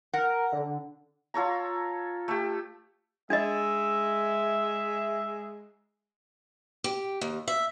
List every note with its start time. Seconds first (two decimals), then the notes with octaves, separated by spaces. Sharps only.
0.13 A#4 F#5
0.52 D3
1.34 F4 A4 C#5 A#5
2.28 A3 G4
3.30 G#3 D4 D#5 E5
6.84 G4
7.21 D#2
7.48 E5